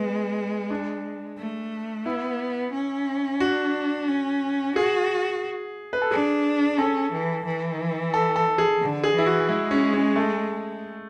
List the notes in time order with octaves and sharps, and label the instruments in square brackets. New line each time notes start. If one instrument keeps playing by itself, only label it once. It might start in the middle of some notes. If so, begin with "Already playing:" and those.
Already playing: [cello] G#3 [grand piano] B3
[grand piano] D4
[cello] A3
[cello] B3 [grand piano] E4
[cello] C#4
[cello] D4 [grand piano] F#4
[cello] C#4
[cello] F#4 [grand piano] G#4
[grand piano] B4
A4
[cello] D4 [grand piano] G#4
[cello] C#4 [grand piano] A4
[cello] E3
E3
[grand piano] A4
A4
G#4
[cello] D3
[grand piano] G#4
[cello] E3 [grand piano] E4
[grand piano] F#4
[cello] G#3 [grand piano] E4
[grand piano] C#4
C#4
A3